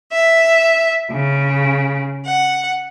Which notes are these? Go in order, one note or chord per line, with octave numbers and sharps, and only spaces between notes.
E5
C#3
F#5